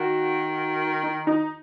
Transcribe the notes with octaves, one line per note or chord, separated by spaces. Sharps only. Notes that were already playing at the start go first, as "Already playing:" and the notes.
Already playing: D#3 F#4
D#4
D#4